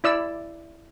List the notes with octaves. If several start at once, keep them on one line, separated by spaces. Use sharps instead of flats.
E4 D5 E6